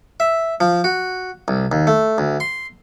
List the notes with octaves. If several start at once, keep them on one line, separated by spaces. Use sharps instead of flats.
E5
F3
F#4
C2
D#2
A3
D2
C6